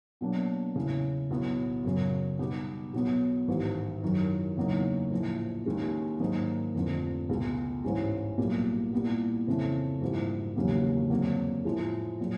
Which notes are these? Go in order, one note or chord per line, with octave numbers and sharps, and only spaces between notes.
B2 F#3 A#3 D4
E2 C#3 E3
B1 A2 F#3 B3
F#2 C#3 F#3
B2 G3 B3 D#4 G4
B1 B2 F#3 B3
A1 G#2 D#3
F#2 D#3 F#3
E2 C#3 F#3 A#3 D#4
A#1 A2 F3
D#2 D#3 G#3 C#4
G#2 D#3 F#3 A#3 D#4
F1 F2 D3 F3
C#2 B2 G#3
A1 G#2 E3 G#3 C#4
B1 A#2 G3 A#3
A#2 G3 B3 E4
F2 C#3 E3 A3
A#1 G#2 E3 G3 A#3
E1 D#2 C#3 F#3 A#3
F2 D3 F#3 A#3
A2 F3 G#3
A#2 F#3